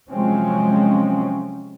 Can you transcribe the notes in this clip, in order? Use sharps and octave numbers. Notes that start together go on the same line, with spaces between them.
C3 F3 F#3 G#3 C4 C#4